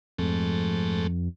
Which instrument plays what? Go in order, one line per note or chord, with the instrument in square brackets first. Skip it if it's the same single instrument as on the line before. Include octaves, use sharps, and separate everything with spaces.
[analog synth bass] F2 [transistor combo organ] G#2 A3